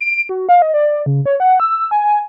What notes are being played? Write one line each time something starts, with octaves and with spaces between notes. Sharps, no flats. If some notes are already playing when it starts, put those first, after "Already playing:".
D7
F#4
F5
D#5
D5
C#3
C#5
F#5
E6
G#5